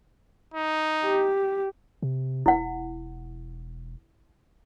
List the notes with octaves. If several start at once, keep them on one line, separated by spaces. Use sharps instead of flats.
D#4
G4
C3
E1 E4 F#5